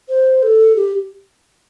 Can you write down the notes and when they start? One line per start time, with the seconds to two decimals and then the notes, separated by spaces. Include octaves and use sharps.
0.09 C5
0.43 A4
0.76 G4